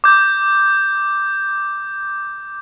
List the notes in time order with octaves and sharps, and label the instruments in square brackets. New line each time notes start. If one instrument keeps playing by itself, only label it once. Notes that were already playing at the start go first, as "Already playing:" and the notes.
[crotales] D6 G6